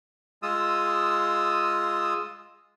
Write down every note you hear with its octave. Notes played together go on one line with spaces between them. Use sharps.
G#3 F4 D#6 E6